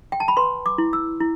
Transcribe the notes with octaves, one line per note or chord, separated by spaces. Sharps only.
G5
A5
B5
B4 C6
D6
E4
E6
E4